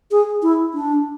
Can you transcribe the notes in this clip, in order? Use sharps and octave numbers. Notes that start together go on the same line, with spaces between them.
G#4
E4
D4